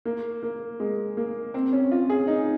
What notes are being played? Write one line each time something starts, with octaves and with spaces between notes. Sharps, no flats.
A#3
A#3
G#3
A#3
C4
C#4
F4
G#4
D#4